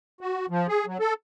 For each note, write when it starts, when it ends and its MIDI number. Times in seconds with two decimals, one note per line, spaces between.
0.21 0.46 66
0.50 0.67 53
0.69 0.86 68
0.86 0.98 54
1.00 1.14 69